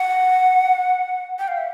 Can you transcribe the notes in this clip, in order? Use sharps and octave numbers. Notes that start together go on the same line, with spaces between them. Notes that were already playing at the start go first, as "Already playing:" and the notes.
Already playing: F#5
G5
F5
E5